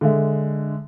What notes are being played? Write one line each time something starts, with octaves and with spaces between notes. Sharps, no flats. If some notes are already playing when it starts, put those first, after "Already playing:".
D3 G#3 E5